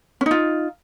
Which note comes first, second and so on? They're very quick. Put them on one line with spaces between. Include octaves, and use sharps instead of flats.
C#4 D#4 F4